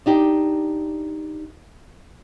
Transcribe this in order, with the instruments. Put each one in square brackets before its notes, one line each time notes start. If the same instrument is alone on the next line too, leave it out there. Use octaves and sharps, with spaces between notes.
[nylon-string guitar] D4 D#4 G4